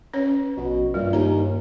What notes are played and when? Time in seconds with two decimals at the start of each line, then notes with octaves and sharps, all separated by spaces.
0.14 C#4 B4 C#5
0.58 A#1 B2
0.94 G2 A#2 G3
1.13 D#2 A#5